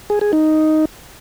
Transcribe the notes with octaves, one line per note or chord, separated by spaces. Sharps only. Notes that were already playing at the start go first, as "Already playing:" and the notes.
G#4
G#4
D#4